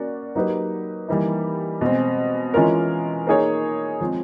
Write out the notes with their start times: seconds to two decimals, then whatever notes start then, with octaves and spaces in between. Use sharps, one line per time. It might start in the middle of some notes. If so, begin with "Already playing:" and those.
Already playing: A#3 C#4 F#4 D5
0.35 F#3 A#3 D#4 G4 B4
1.08 E3 G3 A#3 D#4
1.81 B2 G#3 C4
2.54 E3 G#3 C#4 F4 A#4
3.27 A#3 D#4 G#4 C#5
4.00 F3 G#3 C4